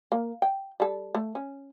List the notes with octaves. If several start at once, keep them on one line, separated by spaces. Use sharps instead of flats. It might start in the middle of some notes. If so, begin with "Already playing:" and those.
A#3
G5
G3 A4
A3
C#4